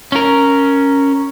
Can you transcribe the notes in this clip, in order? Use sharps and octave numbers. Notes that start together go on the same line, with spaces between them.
C#4 A#4